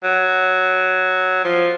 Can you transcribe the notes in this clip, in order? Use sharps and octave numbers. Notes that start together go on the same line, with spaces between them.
F#3
F3